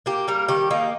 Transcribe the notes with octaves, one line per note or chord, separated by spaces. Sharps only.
A#3 G4
G3 A#4
D#3 G4
A#3 D#4